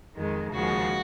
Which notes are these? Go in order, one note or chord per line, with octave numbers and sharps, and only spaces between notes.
F2 D#3 G#3
D#2 C#3 F3 G#3 F#4